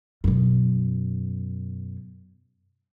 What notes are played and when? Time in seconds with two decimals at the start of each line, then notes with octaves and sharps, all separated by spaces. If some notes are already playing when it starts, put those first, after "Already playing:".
0.24 F#2 B2